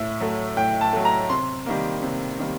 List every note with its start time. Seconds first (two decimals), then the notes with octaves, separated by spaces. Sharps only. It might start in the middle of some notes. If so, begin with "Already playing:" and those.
Already playing: A2 E5
0.20 F#3 A3
0.56 A2 G5
0.81 A5
0.93 F#3 A3
1.05 A#5
1.30 C3 C6
1.66 D#3 G3 A#3
2.03 C3
2.39 D#3 G3 A#3